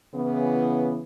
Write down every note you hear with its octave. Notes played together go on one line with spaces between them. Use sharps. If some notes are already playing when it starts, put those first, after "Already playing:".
C#3 E3 B3